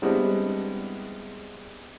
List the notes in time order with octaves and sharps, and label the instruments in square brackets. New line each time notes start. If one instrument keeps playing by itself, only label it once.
[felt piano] G3 G#3 B3 C4 D4 E4